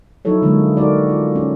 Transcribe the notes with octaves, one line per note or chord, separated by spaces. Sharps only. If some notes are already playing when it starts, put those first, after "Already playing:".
F3 F#3 D#4 E4 A4 C#5
D3 E3 F#3 G#3 A#3
D#4 F#4 A4 A#4 D5
F4
C#4